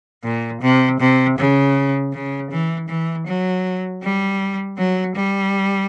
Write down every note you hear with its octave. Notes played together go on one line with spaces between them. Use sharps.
A#2
C3
C3
C#3
C#3
E3
E3
F#3
G3
F#3
G3